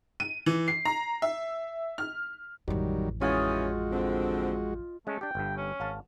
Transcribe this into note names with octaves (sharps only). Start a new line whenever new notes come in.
D#7
E3
C7
A#5
E5
F6
A1 F2 D#3 F#3 G3
E3 G#3 C#4 F4 F#4 D#5 G5
D3 C4
G#3 A3 C#4
D4 G4 G5
G1 G2
C#4
G#1 F5 A5